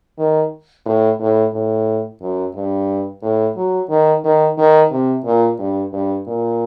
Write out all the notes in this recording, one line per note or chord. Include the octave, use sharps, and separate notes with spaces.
D#3
A2
A2
A2
F#2
G2
A2
F#3
D#3
D#3
D#3
C3
A#2
G2
G2
A#2